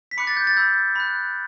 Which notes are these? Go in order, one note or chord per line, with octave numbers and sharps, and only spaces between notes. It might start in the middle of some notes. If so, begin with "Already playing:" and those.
B6
B5 D6 F#6 C#7
A6
G6
A6
B5 E6 G6
B5 F#6